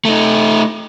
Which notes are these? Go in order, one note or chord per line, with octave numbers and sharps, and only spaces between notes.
A3 D#4